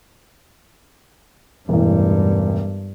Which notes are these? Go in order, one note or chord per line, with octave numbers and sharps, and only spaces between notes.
E1 A1 G2